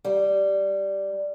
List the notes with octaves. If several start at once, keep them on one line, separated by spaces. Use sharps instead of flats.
G3